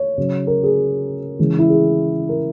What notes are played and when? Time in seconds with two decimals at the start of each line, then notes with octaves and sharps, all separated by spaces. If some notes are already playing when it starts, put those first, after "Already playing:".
Already playing: C#5
0.18 C#3 F#3
0.47 A#4
0.64 G#4
1.39 C#3 E3 G#3
1.59 E4
1.70 G#4
2.29 A#4